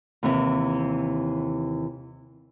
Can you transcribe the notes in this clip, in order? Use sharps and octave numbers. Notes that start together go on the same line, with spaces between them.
D#2 C3 E3